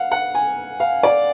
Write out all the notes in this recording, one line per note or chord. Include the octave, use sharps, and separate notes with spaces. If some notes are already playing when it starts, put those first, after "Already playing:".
Already playing: F5 F#5
F#5
G#5
F5
D5